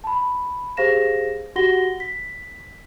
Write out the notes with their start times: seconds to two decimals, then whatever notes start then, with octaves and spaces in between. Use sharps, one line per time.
0.04 A5 B5
0.77 G4 G#4 C5 F5 A#6 E7
1.56 F#4 G4 F#5 A#6 G7
2.00 B6